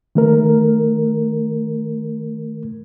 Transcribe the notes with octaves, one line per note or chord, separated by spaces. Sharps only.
D#3 A3 A#4